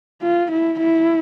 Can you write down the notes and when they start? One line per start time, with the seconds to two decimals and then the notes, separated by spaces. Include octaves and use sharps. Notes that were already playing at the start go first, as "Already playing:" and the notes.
0.22 F4
0.52 E4
0.80 E4